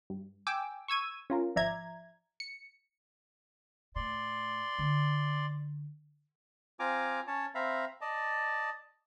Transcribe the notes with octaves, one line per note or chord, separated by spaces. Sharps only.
G2
G5 G#5 D6 E6
C#6 E6 G#6 D#7
C#4 F4 A#4
G#1 F3 D5 E5 A#5 G#6
C#7
A2 D5 C6
D3
C4 F4 G#5 A#5 D6
C#4 C#5 A5
C4 E5 F5 A#5 B5
D5 D#5 A5